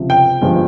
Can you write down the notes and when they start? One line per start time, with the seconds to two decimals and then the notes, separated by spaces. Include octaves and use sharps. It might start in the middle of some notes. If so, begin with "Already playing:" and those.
Already playing: C#2 C3 F3
0.10 G5
0.42 G1 G2 F3 G#3